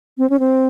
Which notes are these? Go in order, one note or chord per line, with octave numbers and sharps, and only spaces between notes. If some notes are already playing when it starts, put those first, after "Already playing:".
C4
C#4
C4